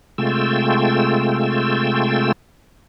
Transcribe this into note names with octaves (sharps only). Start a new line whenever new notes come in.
C3 G#3 A3 F4 G5 E6